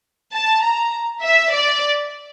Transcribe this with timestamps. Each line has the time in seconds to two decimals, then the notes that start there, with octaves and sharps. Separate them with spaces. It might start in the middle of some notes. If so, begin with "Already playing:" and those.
0.33 A5
0.63 A#5
1.22 E5
1.52 D5